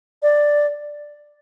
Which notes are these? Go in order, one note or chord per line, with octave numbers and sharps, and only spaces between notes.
D5